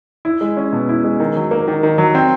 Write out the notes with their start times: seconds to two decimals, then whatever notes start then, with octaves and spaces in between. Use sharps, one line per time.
0.25 E4
0.41 G#3
0.57 C#4
0.73 B2
0.89 E4
1.04 G#3
1.20 D#3
1.36 F#3
1.51 A#3
1.68 D#3
1.83 D#3
1.98 F#3
2.15 C4